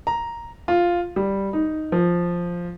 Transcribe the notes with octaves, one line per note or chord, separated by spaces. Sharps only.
A#5
F4
G3
D#4
F3